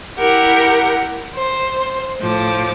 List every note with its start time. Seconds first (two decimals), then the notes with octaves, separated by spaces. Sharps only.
0.17 E4 G4 A#4 F#5
1.34 C5
2.20 A2 F3 D6